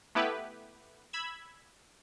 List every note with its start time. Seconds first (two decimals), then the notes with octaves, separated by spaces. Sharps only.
0.15 A3 B3 E4 G4 B4
1.13 B5 E6 G#6